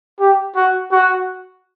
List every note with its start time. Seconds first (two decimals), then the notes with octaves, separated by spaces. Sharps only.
0.20 G4
0.56 F#4
0.91 F#4